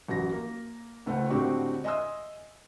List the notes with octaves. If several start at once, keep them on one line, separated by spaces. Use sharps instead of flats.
A1 F#2 F#3 A#6
A#3
C#2 A3 C5 F#5
A2 D3 G#3 C4 F#4 G4
D#5 E5 G#5 C6 D#6 E6